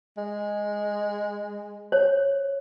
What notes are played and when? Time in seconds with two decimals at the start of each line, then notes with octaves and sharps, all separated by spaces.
0.17 G#3
1.92 C5 C#5